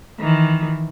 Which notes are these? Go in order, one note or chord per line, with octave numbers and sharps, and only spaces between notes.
D#3 E3